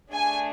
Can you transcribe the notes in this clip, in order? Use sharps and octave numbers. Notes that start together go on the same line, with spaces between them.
A3 D4 G#4 G#5